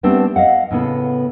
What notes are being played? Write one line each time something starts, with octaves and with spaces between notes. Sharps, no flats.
G3 A3 B3 C4 D4
D#5 F5 F#5
A2 C#3 B3 A4